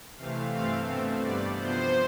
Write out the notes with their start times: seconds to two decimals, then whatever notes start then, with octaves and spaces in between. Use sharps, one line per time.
0.17 C3 E3 A3 C4 F5
0.52 G2 E3 A3 C4 F5
0.87 B2 A3 C4
1.22 G2 D3 G3 B3 D5
1.56 C3 F3 B3 C5